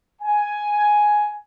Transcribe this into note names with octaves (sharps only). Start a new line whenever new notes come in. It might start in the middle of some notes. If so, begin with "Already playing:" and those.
G#5